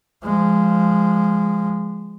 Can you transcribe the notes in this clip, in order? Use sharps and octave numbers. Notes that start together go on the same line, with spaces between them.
F3 G#3